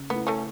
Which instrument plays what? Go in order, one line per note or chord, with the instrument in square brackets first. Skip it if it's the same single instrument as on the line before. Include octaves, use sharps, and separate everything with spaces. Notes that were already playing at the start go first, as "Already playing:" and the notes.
Already playing: [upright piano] C#3
[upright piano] A3 E4 [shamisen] B3
[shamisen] A3 C#4